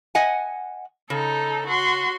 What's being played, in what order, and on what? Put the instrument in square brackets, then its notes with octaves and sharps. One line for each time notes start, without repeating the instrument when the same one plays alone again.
[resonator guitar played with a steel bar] D#5 F#5 G#5
[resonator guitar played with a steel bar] C#3 [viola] D#4 A4
[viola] F#4 C6